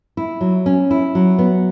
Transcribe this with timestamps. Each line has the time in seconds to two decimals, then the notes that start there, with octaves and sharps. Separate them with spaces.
0.17 E4
0.41 F#3
0.66 C#4
0.91 E4
1.15 F#3
1.39 B3